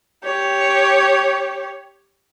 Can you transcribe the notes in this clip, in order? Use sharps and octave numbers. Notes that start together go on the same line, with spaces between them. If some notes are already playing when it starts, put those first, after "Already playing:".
G4 C#5